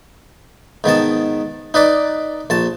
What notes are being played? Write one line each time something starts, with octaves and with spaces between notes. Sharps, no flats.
G#2 D#3 B3 A5
D#4 B4 D5 D6
A#1 A5